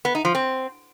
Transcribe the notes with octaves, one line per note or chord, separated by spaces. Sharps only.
B3
D#4
F3
C4